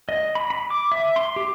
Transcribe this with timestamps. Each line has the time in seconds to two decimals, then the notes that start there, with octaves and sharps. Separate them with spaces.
0.09 D#5
0.35 B5
0.50 B5
0.70 D6
0.92 E5
1.16 C6
1.36 G4